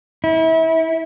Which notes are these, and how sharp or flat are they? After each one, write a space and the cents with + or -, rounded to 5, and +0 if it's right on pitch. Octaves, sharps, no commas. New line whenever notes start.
E4 -30